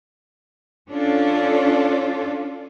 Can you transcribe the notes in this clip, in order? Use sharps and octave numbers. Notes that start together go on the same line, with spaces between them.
C#4 D4 F4 A4